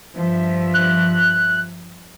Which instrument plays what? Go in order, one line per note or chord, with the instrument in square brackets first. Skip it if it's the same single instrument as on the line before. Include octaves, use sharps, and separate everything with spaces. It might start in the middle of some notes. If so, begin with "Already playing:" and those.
[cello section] G2 F3 E5
[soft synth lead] F#6